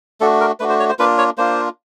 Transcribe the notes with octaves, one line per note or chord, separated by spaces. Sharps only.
A3 D4 F#4 A4
A#4
A3 D4 F#4 B4
C5
C#5
C5
A#3 D4 F4 B4
C#5
A#3 D4 F4 C5